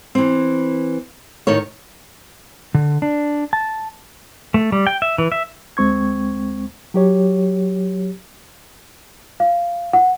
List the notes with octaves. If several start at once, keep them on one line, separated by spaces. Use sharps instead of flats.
E3 C4
A2 D#3 D#4 A#4 C#5
D3
D4
A5
A3
G3
G5
E5
E3
E5
D2 G#3 C4 C#6 G#6
F#3 G4 C#5
F5
F#5